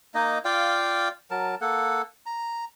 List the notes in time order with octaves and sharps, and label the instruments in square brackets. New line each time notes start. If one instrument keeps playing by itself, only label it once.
[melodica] A#3 D#4 D#5
F4 D5 F5 G5
F#3 A#4 A5
A#3 A4 F#5
A#5